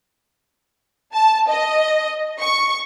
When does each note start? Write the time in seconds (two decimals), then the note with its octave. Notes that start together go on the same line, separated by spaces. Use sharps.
1.14 A5
1.48 D#5
2.39 C#6